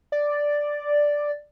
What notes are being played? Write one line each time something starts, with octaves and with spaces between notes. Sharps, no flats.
D5